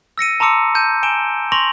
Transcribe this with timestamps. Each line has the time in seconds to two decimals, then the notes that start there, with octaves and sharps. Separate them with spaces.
0.18 E6 A#6 C#7 D#7
0.40 A5 A#5 C6 D6 E6 C#7
0.75 A5 G6 D#7
1.03 G#5 D7 E7 G7
1.52 C6 C#6 A#6 F7 F#7